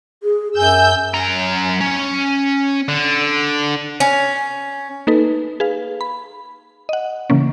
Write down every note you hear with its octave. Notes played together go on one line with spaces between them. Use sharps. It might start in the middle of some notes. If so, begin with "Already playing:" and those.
G#4
F#2 G#5 E6 G6
F#2 A#5
C#4
D3
C#4
A#3 D#4 A4 B4
G#4 B4 F5
B5
D#5 F#5
C#3 E3 A#3 C#4